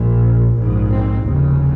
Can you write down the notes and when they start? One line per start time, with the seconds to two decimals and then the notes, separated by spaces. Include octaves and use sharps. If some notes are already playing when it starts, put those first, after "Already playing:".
Already playing: A#1 A#2
0.56 A#1 G#2
0.90 C4
1.24 F1 D#2 C#3